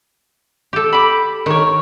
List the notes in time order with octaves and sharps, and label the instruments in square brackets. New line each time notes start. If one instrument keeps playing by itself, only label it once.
[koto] G4 A4
[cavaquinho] B5 D6
[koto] D#3 [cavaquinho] A#4 C#5